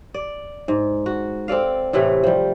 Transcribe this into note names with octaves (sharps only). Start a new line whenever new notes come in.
D5
G#2
F#4
C4 A4 D5 F5
A2 C3 E3 A3
F3 G3